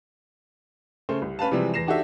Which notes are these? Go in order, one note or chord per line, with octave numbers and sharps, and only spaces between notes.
C#3 A3 C5
C2
C#4 B4 F5 A5
C3 E3 F3 G3 G#3 C4
E2 A#6 C7 E7
D4 D#4 F#4 G4 A4 E5